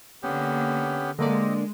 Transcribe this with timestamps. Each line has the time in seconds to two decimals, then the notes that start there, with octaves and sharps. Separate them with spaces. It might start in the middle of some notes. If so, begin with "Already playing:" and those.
0.23 D3 A#3 B3 C#4 G4
1.19 D3 G#3 A#3 C4 D5 D#5